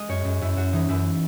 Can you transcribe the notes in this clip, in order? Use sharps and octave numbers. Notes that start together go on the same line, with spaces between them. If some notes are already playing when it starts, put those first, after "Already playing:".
Already playing: G#3 D#5
F#2 C#5
F#2
F#2 E4
F#2 F#4
E3 D#4
F#2 E4